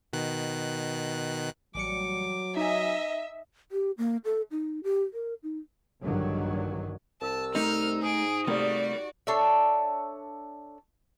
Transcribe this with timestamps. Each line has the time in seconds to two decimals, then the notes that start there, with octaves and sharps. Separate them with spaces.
0.13 B2 D#3 F#6
1.75 A1 F#3 G3 D6 C#7
2.57 D#4 D#5 E5 G#5
3.72 G4
3.98 A#3
4.25 A4
4.51 D#4
4.84 G4
5.13 A#4
5.43 D#4
6.03 A#1 G2 D3 D#3 F#3
7.22 C2 A5 E6
7.55 A3 C4 D#4 F6
8.02 G#2 G#4 D#6 D7
8.47 C3 G3 A3 A#3 F#4 D5
9.27 D4 A4 C#5 E5